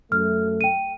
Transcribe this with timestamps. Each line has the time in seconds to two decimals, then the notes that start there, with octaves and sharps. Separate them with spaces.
0.12 F#2 A3 F6
0.61 G5 D#7